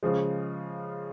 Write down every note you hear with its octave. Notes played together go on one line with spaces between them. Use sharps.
C#3 F3 G#3